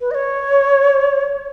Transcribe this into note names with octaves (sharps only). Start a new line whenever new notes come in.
B4
D#5
C#5